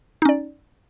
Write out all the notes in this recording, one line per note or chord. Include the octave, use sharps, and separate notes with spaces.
C#4 D#4 D5